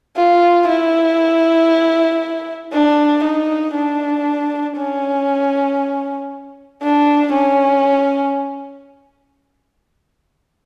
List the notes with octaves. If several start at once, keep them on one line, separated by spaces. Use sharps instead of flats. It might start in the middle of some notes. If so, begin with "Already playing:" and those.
F4
E4
D4
D#4
D4
C#4
D4
C#4